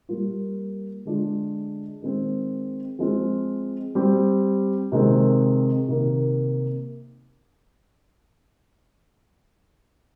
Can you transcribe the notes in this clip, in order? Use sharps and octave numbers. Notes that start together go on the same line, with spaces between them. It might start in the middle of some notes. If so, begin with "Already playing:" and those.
G3 A#3 F4
D3 G#3 D4 F4
D#3 G#3 C4
F3 G#3 C4 F4
G3 C4 G4
C3 D#3 G#3 C4
C3 D#3 A#3